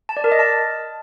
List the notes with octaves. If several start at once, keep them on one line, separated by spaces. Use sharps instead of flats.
A5
D5
A#4
D#5
A5